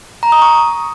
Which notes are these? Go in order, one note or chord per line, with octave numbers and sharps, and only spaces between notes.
A#5
D#6
C#6